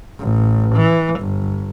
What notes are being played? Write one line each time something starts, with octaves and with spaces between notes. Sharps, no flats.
A1
E3
G1